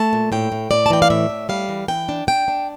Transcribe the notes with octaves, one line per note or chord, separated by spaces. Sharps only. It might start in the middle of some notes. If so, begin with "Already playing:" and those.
Already playing: A3 A5
A#2
A2 G5
A2
A2 D5
A5
E3 G5
F5
A2 E5
A2
G3 F5
E3
E3 G5
D4
D4 G5
D4